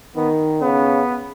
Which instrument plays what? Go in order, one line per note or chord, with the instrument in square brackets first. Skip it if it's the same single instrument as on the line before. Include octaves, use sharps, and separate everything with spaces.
[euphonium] D#3 [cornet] B3
[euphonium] C#3 [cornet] B3